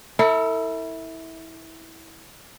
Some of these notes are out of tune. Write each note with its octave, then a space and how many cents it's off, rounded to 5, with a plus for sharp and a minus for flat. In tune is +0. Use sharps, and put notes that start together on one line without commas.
E4 -20 A4 +40